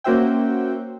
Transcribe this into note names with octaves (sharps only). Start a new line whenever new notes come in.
A#3 C#4 F#4 C5 E5 G5